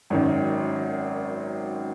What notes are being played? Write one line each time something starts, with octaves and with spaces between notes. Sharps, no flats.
G#1 F#2 D#3